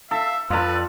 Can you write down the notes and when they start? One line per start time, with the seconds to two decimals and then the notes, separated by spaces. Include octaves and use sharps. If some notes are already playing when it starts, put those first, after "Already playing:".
0.11 A4 E5 F5
0.50 F2 F4 A4 B4 D5